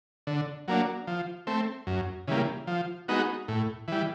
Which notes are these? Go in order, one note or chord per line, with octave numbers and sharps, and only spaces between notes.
D3
F#3 A#3 D4
F3
A3 C4
F#2
C#3 E3 G3 A#3
F3
G#3 B3 D#4 F#4
A2
E3 G3